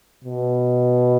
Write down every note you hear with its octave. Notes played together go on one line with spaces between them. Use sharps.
B2